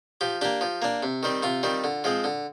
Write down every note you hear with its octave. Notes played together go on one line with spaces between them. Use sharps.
F3 G4
A#3 D4 G4
F3
A#3 D4
C3
D#3 G3 C4
C3 F4
D#3 G3 C4
D3
F3 G#3 C4
D3